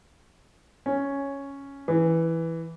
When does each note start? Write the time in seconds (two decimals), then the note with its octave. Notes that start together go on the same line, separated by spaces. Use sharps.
0.86 C#4
1.88 E3